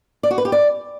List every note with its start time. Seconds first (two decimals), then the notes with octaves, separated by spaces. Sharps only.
0.23 D5
0.31 F#4
0.38 B4
0.45 G4
0.52 D5